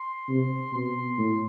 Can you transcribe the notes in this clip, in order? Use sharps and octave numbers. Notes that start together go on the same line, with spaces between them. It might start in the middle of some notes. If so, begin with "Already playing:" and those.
Already playing: C6
C3
B2 C6
A2